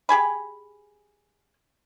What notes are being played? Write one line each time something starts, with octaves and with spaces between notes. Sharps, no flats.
G4 G#4 G#5 B5